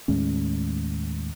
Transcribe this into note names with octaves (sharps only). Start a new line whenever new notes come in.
D#2 A2 G#3 C#4